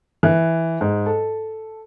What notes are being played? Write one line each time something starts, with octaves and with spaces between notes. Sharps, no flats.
E3
G#2
A4